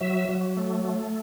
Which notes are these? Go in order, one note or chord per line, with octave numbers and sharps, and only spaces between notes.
F#3 E5
F#3
A3
A3